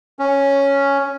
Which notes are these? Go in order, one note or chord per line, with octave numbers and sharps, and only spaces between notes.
C#4